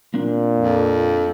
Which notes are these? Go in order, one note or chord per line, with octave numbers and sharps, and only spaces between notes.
A#2 A#3 C4 D4
F2